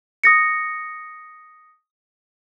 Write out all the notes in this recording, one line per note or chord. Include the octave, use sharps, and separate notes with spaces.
D#6 A#6 C#7